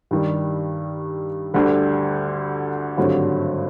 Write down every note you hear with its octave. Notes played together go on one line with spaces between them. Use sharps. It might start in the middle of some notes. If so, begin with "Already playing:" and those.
G2 D#3 G3
D2 D3 G3
G#1 G2 D3 F#3 A3